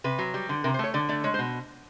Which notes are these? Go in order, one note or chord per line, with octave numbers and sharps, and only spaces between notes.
C3 B4
F#3
G3
D3
C3 A#4
C5
A3 C#5
D3 D5
A3 D5
G#3 C#5
C5
B2